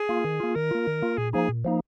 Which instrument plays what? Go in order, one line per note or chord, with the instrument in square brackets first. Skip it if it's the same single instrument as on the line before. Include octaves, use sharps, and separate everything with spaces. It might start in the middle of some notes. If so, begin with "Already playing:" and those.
Already playing: [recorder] G#4
[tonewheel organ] A#3 F4
D#3
A#3 F4
[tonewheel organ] D#3 [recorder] A#4
[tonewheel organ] A#3 F4
D#3
A#3 F4
[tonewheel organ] A#2 [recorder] G#4
[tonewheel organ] F3 A#3 D#4 [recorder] G#4
[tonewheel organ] A#2
F3 A#3 D#4